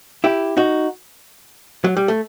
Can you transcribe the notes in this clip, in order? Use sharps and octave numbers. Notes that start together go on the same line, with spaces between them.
E4 G4
D#4 F#4
F#3
G3
A3